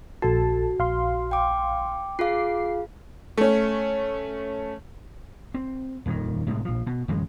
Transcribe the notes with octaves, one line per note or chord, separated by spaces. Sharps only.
A#1 F#4 A4 A5
A#1 F5 C6
G5 D6
F4 G#4 F5 D6 C7
A3 C#4
C4
D#1 F2 C3 D#3
A2 C3 G3 G#3
A#1 F3
B2
D1 F#2 E3 G#3